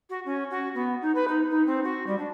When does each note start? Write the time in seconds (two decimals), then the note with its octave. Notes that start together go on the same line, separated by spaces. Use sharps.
0.10 F#4
0.25 C#4
0.50 F#4
0.74 B3
1.01 D#4
1.15 B4
1.27 D#4
1.50 D#4
1.66 C4
1.84 F#4
2.06 G3
2.18 D4